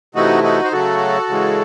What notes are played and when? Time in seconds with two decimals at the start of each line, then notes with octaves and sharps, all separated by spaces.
0.15 C3 E3 A3 D#4 F#4
0.43 D#4 F#4
0.64 C5
0.72 C#3 F#3 A3 F#4 A4
1.29 C#3 E3 G#3